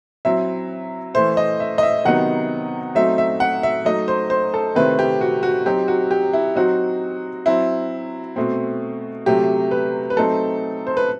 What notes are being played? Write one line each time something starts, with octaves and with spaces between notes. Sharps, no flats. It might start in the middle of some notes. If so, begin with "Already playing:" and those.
F#3 C4 E4 E5
E3 A3 E4 C5
D#5
E5
D#5
E5
C3 D#3 F#3 B3 D#4 F#5
F#3 A3 C4 D#4 E5
E5
F#5
E5
F#3 A3 D#4 D#5
C5
C5
A4
C3 D#3 A3 C4 E4 B4
G4
F#4
F#4
F#3 C4 D#4 G4
F#4
G4
E4
F#3 C4 D#4 F#4
F#3 C4 E4
B2 A3 C4
C3 F#3 A3 G4
B4
B4
F#3 A3 C4 D#4 A4
C5
B4